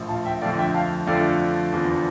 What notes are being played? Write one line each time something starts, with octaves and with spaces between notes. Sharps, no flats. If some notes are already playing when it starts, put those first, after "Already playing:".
Already playing: A#1 A2 F3
F5 A5
E5 G5
F2 D3 F3 A3 D5 F5
E5 G5
F5 A5
F2 D3 F3 A3 D5 F5
E2 D3 F3